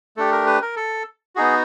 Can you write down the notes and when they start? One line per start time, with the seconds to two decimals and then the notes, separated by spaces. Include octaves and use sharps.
0.17 A3 D4 G4 A4
0.32 A#4
0.47 B4
0.62 A#4
0.76 A4
1.36 B3 D#4 F#4 G#4